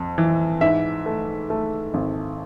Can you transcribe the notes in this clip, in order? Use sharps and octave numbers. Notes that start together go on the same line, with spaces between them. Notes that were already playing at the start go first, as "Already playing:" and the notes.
Already playing: F2
E3
G#2 E5
A3
A3
G#1